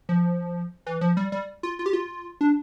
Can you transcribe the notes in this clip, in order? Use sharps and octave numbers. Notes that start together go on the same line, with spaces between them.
F3
E3
F3
G3
G3
F4
F4
G4
F4
D4